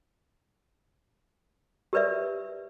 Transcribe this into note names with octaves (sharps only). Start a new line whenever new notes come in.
G4 A#4 B4 D5 E5